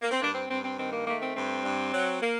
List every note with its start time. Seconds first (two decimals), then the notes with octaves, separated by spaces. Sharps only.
0.02 A#3
0.11 C4
0.21 G2 A#3 D4
0.34 C4
0.49 G2 C4
0.63 C4
0.77 D#3 C4
0.92 A#3
1.06 A3 A#3
1.22 C4
1.36 G2 C4
1.64 G2
1.93 F#3
2.21 A#3